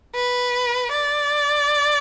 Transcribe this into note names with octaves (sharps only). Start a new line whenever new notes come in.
B4
D5